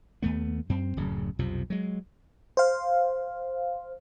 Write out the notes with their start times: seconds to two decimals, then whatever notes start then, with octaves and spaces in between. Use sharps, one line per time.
0.22 D#2 A3 B3
0.70 F#2 C4
0.97 D1 F#2 C#3
1.39 B1 F2 C3 F3
1.70 F#3 G#3
2.57 C5 F5